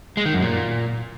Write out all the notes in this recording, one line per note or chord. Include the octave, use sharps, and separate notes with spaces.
G#3
D#3
F#2
A#2